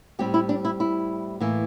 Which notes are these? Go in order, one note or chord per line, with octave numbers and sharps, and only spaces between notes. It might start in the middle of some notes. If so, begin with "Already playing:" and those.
A2 G3 C4 G4
E4
D4
E4
E4
A2 E3 A#3